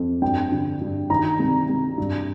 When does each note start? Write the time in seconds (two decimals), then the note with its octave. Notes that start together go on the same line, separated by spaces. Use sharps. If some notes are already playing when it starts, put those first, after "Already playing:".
Already playing: F2
0.22 G2 G5
0.52 D3
0.81 G2
1.10 D#3 A#5
1.39 C2
1.69 C2
1.98 G2